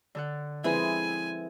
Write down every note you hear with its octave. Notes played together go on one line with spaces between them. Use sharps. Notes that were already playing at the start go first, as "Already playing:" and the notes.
D3 A4 F#5
F3 G#3 C4 E4 B4 E5 G#5